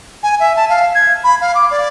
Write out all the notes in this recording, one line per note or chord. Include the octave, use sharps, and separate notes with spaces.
G#5
E5
A5
F5
G#6
B5
F5
D6
D5